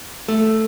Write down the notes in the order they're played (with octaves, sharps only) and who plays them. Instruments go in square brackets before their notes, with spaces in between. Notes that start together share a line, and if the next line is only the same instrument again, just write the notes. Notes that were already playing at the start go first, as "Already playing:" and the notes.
[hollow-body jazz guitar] A3